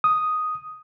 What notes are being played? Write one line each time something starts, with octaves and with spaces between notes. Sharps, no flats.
D#6